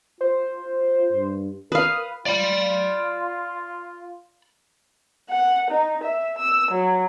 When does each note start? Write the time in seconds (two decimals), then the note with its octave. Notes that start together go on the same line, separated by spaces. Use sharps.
0.21 F4 C5
1.13 G2
1.72 A#4 B4 F5 D#6
2.26 F4 D5 B5
5.29 F#5
5.70 D#4
6.04 E5
6.38 E6
6.71 F#3